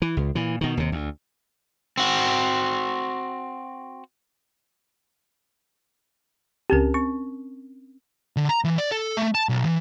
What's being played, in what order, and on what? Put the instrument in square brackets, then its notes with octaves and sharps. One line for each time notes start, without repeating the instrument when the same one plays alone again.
[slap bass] E3
C#2
A#2 E3
B2 D#3
D#2 C3
D2
[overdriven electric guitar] C4 F#4
[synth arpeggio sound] C#2 G4 [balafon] C4 C#4 A#4
[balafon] C4 [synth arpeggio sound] C#6
[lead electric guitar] D3
A#5
E3
D5
A4
A3
A5
B1
E3